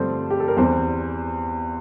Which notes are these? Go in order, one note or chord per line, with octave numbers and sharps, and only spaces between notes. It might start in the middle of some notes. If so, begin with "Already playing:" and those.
Already playing: G2 D3 F3 G3 A3 C4 A4 C5
G4
A4
A#4
E2 E3 G3 C4 C5